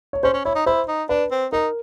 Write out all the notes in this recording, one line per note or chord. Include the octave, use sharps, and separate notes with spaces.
C#5
C#4 C5
C#4
E4 C#5
D#4
E4 C5
D#4
D4 B4
C4
D#4 A#4